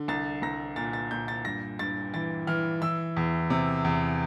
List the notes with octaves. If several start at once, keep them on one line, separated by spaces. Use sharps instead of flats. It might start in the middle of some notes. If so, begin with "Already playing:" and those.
Already playing: D3
C2 A6
C2 A#6
A#2 A6
A6
A#2 G6
A6
G2 A#6
G2 A6
E3 A6
E3 F6
E3 E6
E2
C3
E2